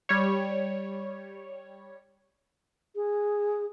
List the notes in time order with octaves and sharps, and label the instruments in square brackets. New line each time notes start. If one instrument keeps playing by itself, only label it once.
[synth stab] G3 C#5
[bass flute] G#4